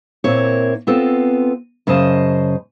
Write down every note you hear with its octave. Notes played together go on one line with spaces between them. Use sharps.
A#2 A#3 C4 E4 C#5
B3 C4 F4 A4
F#2 C#3 C5 D#5 A5